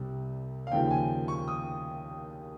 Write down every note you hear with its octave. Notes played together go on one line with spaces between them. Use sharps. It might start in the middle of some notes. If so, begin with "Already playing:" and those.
Already playing: C2 C3 G3
F5
D#2 C#3 F3 G5
G#5
C#6
D#6